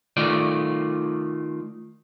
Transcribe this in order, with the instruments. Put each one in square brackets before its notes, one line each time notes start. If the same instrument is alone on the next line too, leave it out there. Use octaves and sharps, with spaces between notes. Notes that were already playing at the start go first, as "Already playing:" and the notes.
[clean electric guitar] D#3 A3 F4 D5